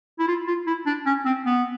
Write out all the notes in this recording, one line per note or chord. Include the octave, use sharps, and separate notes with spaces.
E4
F4
F4
E4
D4
C#4
C4
B3